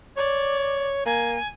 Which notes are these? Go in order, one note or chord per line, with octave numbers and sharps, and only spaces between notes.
C#5 D5
A#3 G#5